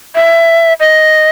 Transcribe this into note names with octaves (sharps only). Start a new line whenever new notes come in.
E5
D#5